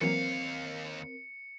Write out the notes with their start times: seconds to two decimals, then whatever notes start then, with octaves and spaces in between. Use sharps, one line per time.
0.01 D#2 E3 F#3 A#3 C4 A#4 F5 C#7